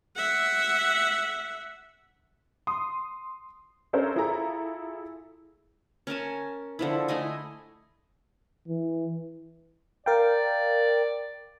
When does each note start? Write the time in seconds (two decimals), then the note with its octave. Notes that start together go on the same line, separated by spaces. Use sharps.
0.16 E5 F#5
2.67 C6 D#6
3.93 C#4 D4 A4 A#4 C5 C#5
4.16 E4 F4 G#4 A4 A#5
6.07 C#4 A#4 G#5 A5
6.79 D3 F3 E4
7.08 A3 E4 D#5 G#5
8.68 E3
10.06 A#4 D5 F5 G5